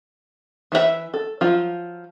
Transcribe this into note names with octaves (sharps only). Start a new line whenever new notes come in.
E3 E4 G#4 E5
A4
F3 F#3 F4